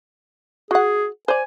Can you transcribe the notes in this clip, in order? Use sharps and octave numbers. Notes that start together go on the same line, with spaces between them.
F#4 G#4 F#5
C5 D5 G#5